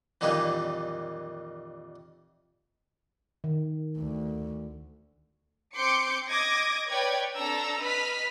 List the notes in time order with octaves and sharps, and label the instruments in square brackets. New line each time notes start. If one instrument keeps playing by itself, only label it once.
[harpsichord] F2 A#2 D#3 E3 G3 A#3
[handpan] D#3
[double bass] D2
[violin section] C4 C6 D6 G6 C#7 D7
D#5 D6 D#6 G#6 A#6
B4 C#5 D5 G5 G#6
C4 D4 A4 A#5 E6
B4 D#5 B5 F6 B6